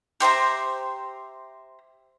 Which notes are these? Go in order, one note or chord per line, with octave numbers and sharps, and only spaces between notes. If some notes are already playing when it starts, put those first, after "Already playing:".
G4 C5 E5 A#5